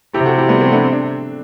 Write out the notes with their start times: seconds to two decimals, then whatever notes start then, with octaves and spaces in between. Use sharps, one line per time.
0.14 C3 E4 G4
0.26 F#4 A4
0.38 E4 G4
0.49 G3 B3
0.60 A3 C4
0.72 B3 D4
0.84 C4
0.93 D4